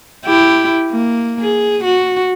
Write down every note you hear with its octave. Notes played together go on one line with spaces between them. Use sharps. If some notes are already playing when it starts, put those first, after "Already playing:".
E4 G4
A#3
G#4
F#4